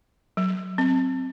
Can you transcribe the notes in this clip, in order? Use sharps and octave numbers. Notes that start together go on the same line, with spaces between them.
F#3
C4